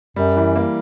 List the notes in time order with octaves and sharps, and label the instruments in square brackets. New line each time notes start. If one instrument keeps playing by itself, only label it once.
[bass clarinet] F#2 [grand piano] G3
[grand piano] E3
A#3